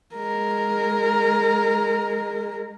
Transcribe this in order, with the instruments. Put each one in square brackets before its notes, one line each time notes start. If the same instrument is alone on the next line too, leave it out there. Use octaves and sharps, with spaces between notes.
[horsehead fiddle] G#3 A#4